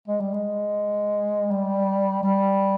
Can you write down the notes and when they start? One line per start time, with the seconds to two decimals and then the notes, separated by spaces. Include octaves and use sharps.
0.08 G#3
0.20 G3
0.34 G#3
1.51 G3
2.23 G3